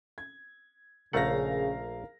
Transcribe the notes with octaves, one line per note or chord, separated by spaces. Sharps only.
G#6
A#1 C#3 A3 A#4 F5 F#5 A#6